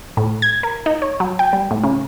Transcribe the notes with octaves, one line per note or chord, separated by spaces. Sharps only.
A2
G#6
A#4
D#4
C#5
F#3
G5
G3
A2
C#3